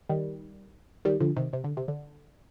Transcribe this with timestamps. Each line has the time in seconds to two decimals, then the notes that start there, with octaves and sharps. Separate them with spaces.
0.09 D#3 G3
1.05 D#3 G3
1.20 D3 F3
1.37 C3 D#3
1.53 C3
1.64 D3
1.77 C3
1.88 D3